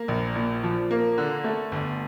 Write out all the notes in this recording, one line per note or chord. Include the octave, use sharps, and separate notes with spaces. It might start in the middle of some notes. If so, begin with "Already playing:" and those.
Already playing: A#3
A#1
A#2
F3
A#3
D3
A3
G1